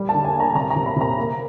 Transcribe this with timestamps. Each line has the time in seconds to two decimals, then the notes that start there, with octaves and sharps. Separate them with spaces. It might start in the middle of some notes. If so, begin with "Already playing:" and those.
Already playing: G3
0.09 A5
0.14 D3
0.25 G#5
0.34 A#3
0.40 A#5
0.55 C3 A#5
0.70 A#5
0.76 C3
0.86 B5
0.96 C3 A#5
1.17 A#3